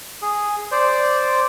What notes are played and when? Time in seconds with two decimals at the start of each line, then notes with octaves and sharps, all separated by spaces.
0.22 G#4
0.71 C5 D5